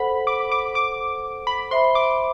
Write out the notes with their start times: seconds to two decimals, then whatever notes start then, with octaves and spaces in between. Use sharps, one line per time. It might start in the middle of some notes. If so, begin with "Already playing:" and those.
Already playing: A4 C5 F#5 B5
0.27 D6
0.52 D6
0.75 D6
1.47 B5
1.71 C5 E5 B5 C6
1.95 D6